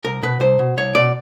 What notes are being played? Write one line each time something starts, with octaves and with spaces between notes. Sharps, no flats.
C2 A#4
B2 B4
C2 C5
B2
C2 C#5
B2 D5